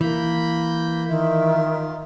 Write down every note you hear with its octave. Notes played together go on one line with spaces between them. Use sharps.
E3 A#3 B5 G6
D#3 F4 E5